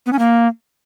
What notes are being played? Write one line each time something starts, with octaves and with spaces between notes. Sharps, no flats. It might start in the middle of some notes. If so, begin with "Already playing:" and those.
B3
C#4
A#3